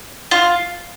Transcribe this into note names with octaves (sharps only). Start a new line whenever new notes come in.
F4